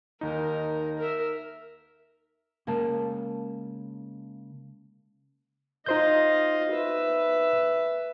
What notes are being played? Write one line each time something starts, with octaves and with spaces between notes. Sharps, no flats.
D#2 D#4 A#4
A#4 E5
C#3 G#3 A#3 A5
D#4 F4 C5 D#5 G6
B4 E5